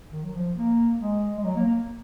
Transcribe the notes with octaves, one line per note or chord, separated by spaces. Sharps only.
D#3
F#3
F3
A#3
G#3
G#3
F#3
A#3
A#3